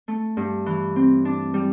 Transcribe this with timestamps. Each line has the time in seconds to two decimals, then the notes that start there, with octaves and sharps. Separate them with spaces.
0.08 A3
0.37 G2
0.66 E3
0.96 C4
1.25 D4
1.54 G3